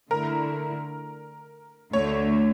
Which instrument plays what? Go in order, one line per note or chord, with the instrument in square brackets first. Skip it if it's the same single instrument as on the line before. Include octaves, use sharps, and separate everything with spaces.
[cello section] D3 A3 E4 [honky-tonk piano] A#4
[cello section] D2 D3 A3 [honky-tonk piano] C#5